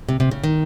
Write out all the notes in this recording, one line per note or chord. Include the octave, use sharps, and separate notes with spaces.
C3
C3
C#3
D#3